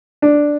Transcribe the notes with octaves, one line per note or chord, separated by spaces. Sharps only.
D4